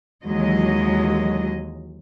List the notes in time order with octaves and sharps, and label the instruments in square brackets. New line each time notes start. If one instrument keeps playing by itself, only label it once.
[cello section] D#2 E3 F#3 G#3 D#5